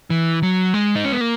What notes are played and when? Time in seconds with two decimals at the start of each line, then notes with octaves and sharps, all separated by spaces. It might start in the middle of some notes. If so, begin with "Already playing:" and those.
0.10 E3
0.43 F#3
0.74 G#3
0.95 D#4
1.04 C#4
1.12 B3
1.21 A#3